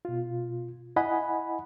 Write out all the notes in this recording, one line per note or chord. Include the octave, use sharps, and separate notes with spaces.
B2 F4
E4 D#5 F#5 G#5 B5